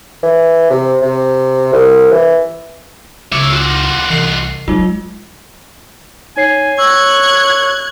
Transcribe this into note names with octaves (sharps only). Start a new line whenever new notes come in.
E3
C3
C3
C2
E3
C#2 C#5 E5 D6
F4 F#4
C2 E3 C7
F#3 G#3 D#4 F4
D#4 C#5 G#5 C7
C#5 E6 F#6 G#6